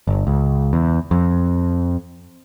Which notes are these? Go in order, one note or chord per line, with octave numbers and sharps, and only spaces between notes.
G1
C#2
E2
F2